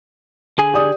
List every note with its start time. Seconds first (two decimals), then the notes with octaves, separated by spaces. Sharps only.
0.58 D3 G#4 G#5
0.73 G4 D5 D#6